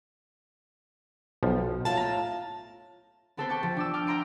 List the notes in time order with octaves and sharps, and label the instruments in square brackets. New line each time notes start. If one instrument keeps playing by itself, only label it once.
[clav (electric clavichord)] B1 F3
[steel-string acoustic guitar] A2 F4 A5
[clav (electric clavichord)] A#5
[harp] B3 C4 A4 B4 C5
G5 A5 C#6 D6 G6 A6
F3
D4 D6 E6
G5 D6 F6
E5 G5 A#5 C6 D7